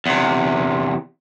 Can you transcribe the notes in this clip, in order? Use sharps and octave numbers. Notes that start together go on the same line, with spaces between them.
E2 C3